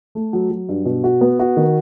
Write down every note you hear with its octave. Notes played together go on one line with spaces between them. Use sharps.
A3
F#3
F#3
G2
B2
F#4
B3
F#4
D#3